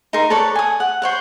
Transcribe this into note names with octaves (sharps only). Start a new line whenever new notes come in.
D#4 A#4 C6
A4 B4 C#5 D5
G#5 D#6
F#5
C5 C#5 F#5